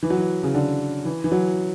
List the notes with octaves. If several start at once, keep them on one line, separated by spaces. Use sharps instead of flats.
E3
F#3
E3
C#3
D3
E3
E3
F#3